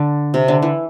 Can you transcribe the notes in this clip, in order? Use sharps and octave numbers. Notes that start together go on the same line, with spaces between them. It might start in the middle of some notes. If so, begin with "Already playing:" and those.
Already playing: D3
C3
D3
E3